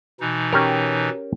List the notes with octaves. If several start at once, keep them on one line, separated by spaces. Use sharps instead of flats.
B2 E3 D#4
C#4 G4 A#4